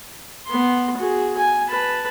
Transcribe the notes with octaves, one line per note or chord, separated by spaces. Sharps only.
B3 C6
F#4 G#4
G#5
B4 A5